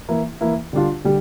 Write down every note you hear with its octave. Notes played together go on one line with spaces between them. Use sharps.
E3 A#3 E4
E3 A#3 E4
D3 G3 D4 F4
D3 G3